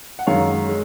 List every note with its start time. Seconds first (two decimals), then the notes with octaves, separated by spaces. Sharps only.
0.19 F#5
0.27 F#2 D#3 G#3 C#5 F5
0.69 G#3